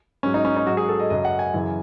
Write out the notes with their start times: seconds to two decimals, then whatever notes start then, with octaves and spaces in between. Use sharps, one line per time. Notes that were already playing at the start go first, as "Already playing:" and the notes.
0.23 G#2 F#3 C#4
0.34 D#4
0.45 C#4
0.56 D#4
0.67 G#2 F#3 F#4
0.77 G#4
0.89 A4
1.00 D#5
1.10 F#2 C#3 F#3 D#5
1.25 F#5
1.39 G#5
1.54 F#2 C#3 E3